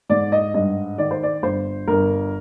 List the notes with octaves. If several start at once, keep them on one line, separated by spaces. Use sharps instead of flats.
G#2 D5
D#5
G2 D#5
D#3 D5
C5
D5
G1 C5
G1 A#4